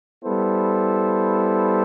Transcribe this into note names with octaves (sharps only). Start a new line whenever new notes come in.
G3 B3 E4 A4 C5